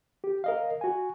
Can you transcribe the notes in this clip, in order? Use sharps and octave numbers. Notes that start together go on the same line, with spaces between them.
G4
A#4 D#5 F5
F#4 G#5